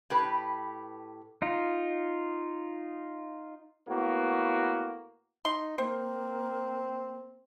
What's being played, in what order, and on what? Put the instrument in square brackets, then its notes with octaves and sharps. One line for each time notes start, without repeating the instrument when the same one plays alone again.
[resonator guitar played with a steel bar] A2 G4 B4
[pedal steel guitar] D#4 F4
[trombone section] A2 A#3 B3 F#4
[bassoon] D#4 [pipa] C6
[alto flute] A#3 [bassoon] C4 [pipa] C5